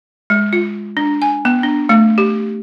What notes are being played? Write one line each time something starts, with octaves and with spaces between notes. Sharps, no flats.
G#3
F4
D4
G#5
B3
D4
A3
G4